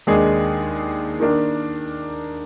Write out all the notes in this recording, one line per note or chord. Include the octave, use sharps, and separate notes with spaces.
D#2 D#3 G#3 D4 G#4
D#3 A#3 D4